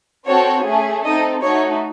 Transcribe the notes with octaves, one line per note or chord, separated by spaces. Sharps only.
C4 F#4 A4 C#5
A3 C#4 G#4
C4 D#4 A4 D#5
A3 D#4 F#4 C#5